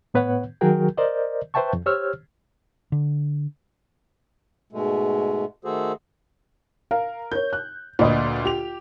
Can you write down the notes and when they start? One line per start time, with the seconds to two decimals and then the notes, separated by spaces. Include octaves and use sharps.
0.14 A2 B3 B4 C#5 F#5
0.61 D#3 F#3 F#4 G#4 A#4 G5
0.97 A#4 C5 D5 D#5
1.54 B4 C5 E5 G5 A5 C#6
1.73 F2
1.86 G4 C5 C#5 E6 F6
2.92 D3
4.72 G#2 B2 G#3 A3
5.65 D#3 A3 F#4 G#4 A4 C5
6.91 A#4 F5
7.32 A#4 C#5 G6
7.53 F#6
7.99 D2 A#2 B4 D5 D#5
8.45 F4 G4 F7